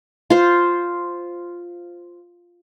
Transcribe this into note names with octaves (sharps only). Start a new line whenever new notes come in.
F4 C5